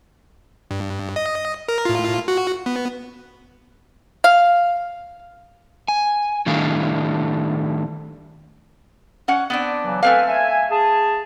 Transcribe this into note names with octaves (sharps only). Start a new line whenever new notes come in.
G2
D#5
A#4
A2 F4
F#4
B3
F5
G#5
A2 D#3 G3 A3 D4 F5
C#4 F#5
B3 C4 D4
C#3 E3 F#3
A3 C4 A4 B4 F5 G#5
E5 G#5
G#4 A5